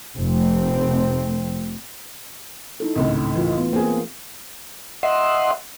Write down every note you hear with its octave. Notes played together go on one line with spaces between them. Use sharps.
F1 A3 C4
D#4 E4 A4
G#1 C#2 A2
E3 A3 F4
B3
A#3 C4 G#4
D#5 E5 F#5 C6